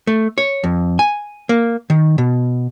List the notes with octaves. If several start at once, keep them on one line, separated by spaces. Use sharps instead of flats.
A3
C#5
F2
G#5
A#3
D#3
B2